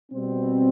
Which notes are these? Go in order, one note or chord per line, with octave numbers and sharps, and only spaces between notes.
B2 G3 C4